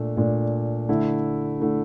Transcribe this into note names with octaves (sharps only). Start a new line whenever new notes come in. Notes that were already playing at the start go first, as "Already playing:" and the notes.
Already playing: A#2 A3 D4
A#2 A3 D4
D3 A3 E4
D3 A3 E4